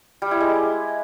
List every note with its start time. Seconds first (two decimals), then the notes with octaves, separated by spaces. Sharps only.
0.22 G3
0.31 E4
0.41 G#3